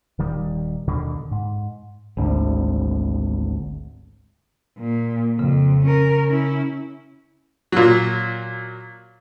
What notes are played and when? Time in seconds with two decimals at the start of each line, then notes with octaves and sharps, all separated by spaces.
0.19 D#1 D#3 G3
0.88 D#2 B2 D3 D#3
1.31 G#2
2.17 G#1 D2
4.79 A#2
5.39 F2 C#3
5.84 C#4 A#4
6.28 C#4 E4
7.72 A#2 F#3